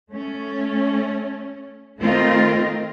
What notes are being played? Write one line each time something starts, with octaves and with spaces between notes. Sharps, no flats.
A3 C#4
D#3 A3 C4 F4 A#4 D#5